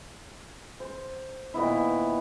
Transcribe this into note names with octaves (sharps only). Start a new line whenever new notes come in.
C5
A#2 D#3 B3 E4